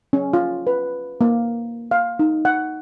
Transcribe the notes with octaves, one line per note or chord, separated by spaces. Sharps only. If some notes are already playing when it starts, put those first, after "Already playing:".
C#4
F4
B4
A#3
F5
D#4
F#5